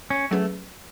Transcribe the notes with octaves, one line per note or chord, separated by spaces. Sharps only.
C#4
F#3 A3 C#4 G#4 B4